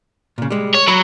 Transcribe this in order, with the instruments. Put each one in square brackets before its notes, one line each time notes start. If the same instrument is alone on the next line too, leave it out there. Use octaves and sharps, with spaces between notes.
[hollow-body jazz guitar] A#2 C#3
G3 G#3
[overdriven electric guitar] C#5
[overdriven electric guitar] F#3 [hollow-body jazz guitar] A#5 B5